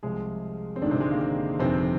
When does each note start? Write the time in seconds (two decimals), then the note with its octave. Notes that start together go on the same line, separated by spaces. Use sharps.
0.03 C2 C3 F3 G#3 G#4
0.76 C4
0.81 G#1 G#2 D3 D#3 D4
0.91 C3 C4
1.01 G#3
1.11 A#3
1.21 A#3
1.59 G1 F2 C3 D#3 C4